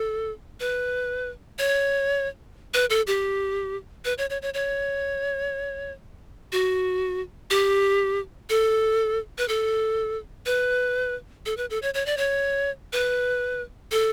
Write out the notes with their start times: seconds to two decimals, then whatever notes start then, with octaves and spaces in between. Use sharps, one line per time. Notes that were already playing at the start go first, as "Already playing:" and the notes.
Already playing: A4
0.60 B4
1.59 C#5
2.74 B4
2.90 A4
3.07 G4
4.05 B4
4.18 C#5
4.30 C#5
4.42 C#5
4.54 C#5
6.52 F#4
7.50 G4
8.50 A4
9.38 B4
9.48 A4
10.46 B4
11.46 A4
11.57 B4
11.70 A4
11.82 C#5
11.94 C#5
12.06 D5
12.17 C#5
12.93 B4
13.91 A4